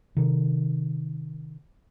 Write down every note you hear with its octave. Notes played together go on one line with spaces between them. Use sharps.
C3 D#3